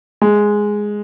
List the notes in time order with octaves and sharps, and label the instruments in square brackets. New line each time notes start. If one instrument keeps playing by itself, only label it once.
[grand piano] G#3